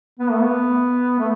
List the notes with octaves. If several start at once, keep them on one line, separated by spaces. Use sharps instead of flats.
B3
A3
B3
A3